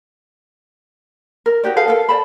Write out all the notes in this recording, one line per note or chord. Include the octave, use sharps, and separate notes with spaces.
A#4
D#4 F#4 G4 D5
G#4 A4 B4 F5
A4 A#4 F5
D5 A5 B5